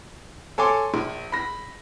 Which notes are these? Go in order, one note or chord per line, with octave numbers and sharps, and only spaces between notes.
A4 C#5 G#5 C6 D6
A#1
B5 A#6